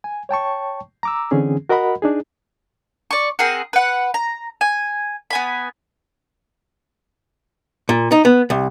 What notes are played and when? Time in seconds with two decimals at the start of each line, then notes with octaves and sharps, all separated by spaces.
0.04 G#5
0.29 C#5 G5 A5 C#6
1.03 A#5 D6 E6
1.31 D3 E3 C4 C#4 G#4
1.69 F#4 A#4 D#5 F#5 B5
2.02 D4 D#4 G#4
3.11 D5 C#6
3.39 C4 G#4 A#4 F#5
3.73 B4 F#5
4.14 A#5
4.61 G#5
5.30 B3 G#5 B5
7.89 A#2
8.12 D#4
8.25 B3
8.50 C2